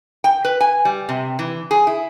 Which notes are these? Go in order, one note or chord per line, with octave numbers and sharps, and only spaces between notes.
G5
B4
G#5
G3
C3
E3
G#4
E4